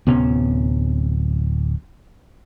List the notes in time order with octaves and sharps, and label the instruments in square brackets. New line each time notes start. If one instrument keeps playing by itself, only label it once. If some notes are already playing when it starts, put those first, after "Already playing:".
[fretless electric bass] D1 C3 B3 C#4